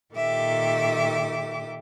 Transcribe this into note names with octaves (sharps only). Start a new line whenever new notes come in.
A#2 D#3 G4 A4 E5 D6